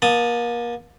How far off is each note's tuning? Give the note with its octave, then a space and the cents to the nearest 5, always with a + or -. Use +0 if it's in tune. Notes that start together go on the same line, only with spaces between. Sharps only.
A#3 +35 A5 +0 D#6 +0